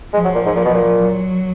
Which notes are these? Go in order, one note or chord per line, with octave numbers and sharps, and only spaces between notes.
F3 G#3
F#3
A#2
G#2
A#2
B2
A#2
F#3